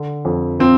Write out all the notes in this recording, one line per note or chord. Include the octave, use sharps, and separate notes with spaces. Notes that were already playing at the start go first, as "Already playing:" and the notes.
Already playing: D3
F2
F3 C4